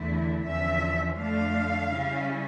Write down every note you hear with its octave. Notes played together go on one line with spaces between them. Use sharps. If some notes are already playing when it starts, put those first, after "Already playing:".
Already playing: E2 D3 A3 E4
E2 D3 F3 C#4 E5
F2 D3 A3 D4 F5
C#3 G3 C#4 E4